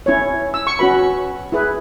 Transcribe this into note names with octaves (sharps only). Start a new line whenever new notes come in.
C#4 E4 C#5
E6
C#6
C#4 F#4 B4 B5
E4 G#4 B4